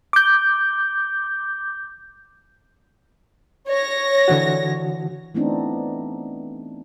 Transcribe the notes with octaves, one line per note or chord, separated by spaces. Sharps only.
D6 G6
C#5 A#6
D3 E3 F#4
E3 A3 B3 C4 D4 D#4